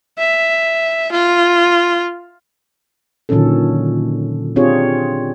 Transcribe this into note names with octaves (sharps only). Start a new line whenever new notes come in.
E5
F4
A#2 D3 D#3 F#3 C#4 A4
C4 D4 F4 G4 G#4 C#5